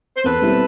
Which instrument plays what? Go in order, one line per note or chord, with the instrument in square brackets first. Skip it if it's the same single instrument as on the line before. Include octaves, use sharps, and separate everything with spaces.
[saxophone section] C5
[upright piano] E2 [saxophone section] A4 B4
[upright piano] B2 G3 C4 E4